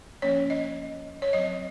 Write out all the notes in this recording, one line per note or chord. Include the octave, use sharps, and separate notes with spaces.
F3 A#3 C#4 C#5
D#5
C#5
F#3 C4 D#5